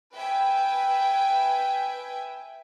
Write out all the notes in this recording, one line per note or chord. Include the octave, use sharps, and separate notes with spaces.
B4 E5 G5 G#5